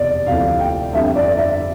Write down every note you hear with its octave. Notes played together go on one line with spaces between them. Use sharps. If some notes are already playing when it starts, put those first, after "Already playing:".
Already playing: F1 E2 B2 D5
D2 C3 F3 A3 E4 F5
G5
G1 F2 D3 G3 E5
D5
E5